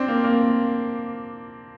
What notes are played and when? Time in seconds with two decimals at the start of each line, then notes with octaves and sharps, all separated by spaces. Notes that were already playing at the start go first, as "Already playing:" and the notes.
Already playing: C4 D4
0.08 A#3
0.24 A#3